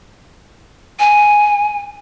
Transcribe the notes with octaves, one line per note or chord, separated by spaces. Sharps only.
G#5